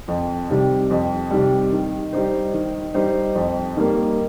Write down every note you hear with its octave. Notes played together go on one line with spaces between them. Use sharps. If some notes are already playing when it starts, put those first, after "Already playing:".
F2
C3 D#3 G3
F2
C3 D#3 G3
D#3
G3 D#4 C5
D#3
G3 D#4 C5
F2
D#3 G3 A#3